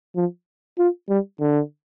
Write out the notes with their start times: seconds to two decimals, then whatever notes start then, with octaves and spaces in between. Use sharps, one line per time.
0.16 F3
0.78 F4
1.09 G3
1.41 D3